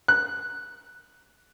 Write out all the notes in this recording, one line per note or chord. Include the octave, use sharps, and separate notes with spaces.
F#6